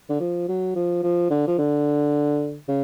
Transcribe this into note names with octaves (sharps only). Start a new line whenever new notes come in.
D3
F3
F#3
F3
F3
D3
F3
D3
C#3